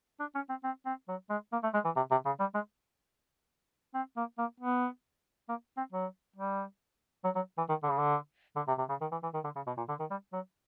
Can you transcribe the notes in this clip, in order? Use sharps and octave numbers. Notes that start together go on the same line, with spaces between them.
D4
C#4
C4
C4
C4
F#3
G#3
A#3
A3
G#3
E3
C3
C3
C#3
G3
G#3
C4
A#3
A#3
B3
A#3
C4
F#3
G3
F#3
F#3
E3
D#3
D3
C#3
D3
D3
C3
C3
C#3
D#3
E3
E3
D#3
D3
C#3
B2
A#2
D3
D#3
G3
F#3